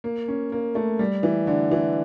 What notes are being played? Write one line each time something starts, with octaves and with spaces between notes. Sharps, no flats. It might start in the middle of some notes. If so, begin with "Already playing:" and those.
A#3
C#4
A#3
A3
G3
E3
D3
E3